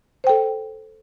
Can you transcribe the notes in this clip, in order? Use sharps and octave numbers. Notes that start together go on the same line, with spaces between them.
A4 C5 G5